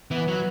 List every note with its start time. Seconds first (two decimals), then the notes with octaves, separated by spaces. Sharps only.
0.11 E3 B3
0.28 F#3